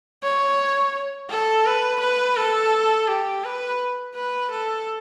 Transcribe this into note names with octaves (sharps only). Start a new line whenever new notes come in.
C#5
A4
B4
B4
A4
G4
B4
B4
A4